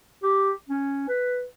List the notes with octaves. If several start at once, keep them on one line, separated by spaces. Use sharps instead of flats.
G4
C#4
B4